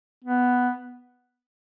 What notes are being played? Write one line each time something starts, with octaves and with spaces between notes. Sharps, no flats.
B3